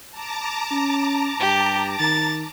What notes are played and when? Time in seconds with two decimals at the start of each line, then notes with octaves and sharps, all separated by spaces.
0.10 A5 A#5 D6
0.71 C#4
1.41 G2 G4
1.99 D#3 A6